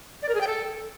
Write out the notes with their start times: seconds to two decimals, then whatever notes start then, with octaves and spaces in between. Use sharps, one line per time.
0.22 D5
0.29 A#4
0.35 G#4
0.41 G5
0.47 A4